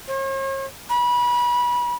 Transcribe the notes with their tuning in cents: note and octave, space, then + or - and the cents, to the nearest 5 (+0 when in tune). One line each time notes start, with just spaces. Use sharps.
C#5 -45
B5 -25